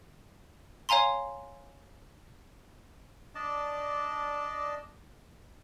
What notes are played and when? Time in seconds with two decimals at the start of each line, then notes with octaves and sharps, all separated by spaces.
0.89 C#5 F5 G#5 A#5 C6
3.35 D4 D5 D#5 A5